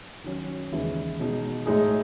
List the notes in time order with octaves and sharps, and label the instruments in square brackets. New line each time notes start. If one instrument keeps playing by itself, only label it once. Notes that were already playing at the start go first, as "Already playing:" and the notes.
[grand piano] D#3 F#3 C#4
D#2 C#3 E3 G#3 D#4
B2 G#3 D#4 F#4
A2 G#3 D#4 G#4